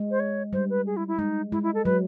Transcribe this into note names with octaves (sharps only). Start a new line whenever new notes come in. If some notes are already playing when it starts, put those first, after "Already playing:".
Already playing: G#3
C5
C#5
G3 C5
B4
G#4
E4
E4
G#3 D#4
G#3 E4
E4
A4
F#3 B4